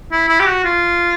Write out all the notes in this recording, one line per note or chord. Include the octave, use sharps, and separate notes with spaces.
E4
E4
G4
F#4
F4